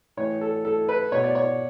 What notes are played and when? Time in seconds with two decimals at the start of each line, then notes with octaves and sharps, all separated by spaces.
0.17 A2 E3 C#5
0.41 A4
0.65 A4
0.89 B4
1.12 B2 C#5
1.24 D5
1.35 C#5